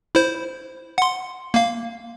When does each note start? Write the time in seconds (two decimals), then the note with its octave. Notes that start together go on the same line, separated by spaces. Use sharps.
0.15 E4 C5
0.98 F#5 C6
1.54 A#3 F5